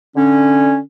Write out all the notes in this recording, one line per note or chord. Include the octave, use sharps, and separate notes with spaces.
D3 C#4